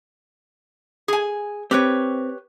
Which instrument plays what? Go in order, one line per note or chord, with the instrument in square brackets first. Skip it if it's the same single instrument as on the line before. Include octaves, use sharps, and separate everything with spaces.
[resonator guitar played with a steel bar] G#4 G#5
[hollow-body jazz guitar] C4 [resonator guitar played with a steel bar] G4 B4 C#5